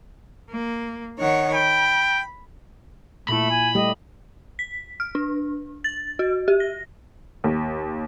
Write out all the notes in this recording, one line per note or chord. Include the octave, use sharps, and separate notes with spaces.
A#3
D#3 C#5 F#5
G5 B5
A#2 A3 E4 B5
G#5
G3 A3 G4 D#5
B6
F6
D4
A6
F#4
G4
A#6
D#2